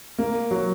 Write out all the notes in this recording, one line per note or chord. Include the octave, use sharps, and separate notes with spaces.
A#3
F#3